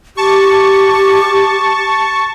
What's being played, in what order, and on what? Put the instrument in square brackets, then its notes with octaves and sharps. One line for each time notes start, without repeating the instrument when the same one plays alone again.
[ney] G4 [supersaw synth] A5 C#6